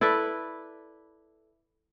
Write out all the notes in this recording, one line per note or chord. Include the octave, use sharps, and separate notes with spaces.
E4 A4 B4 D5